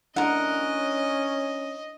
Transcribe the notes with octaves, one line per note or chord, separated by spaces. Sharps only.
C#4 D4 E4 A4 A#4 D#5 F#5